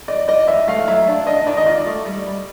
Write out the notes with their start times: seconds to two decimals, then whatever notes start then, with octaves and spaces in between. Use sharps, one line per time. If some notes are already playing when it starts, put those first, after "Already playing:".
0.08 D5 D#5
0.28 D5 D#5
0.48 E3 E5
0.68 A3 F5
0.88 F#3 E5
1.07 D4
1.27 D4 D#5
1.47 D#3 D5
1.57 D#5
1.67 F4 D5
1.86 A3
2.06 G3
2.26 G3